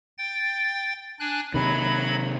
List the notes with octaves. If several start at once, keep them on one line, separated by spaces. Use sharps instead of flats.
G5 A6
D4 G#5 F#6
C3 D#3 F#3 B5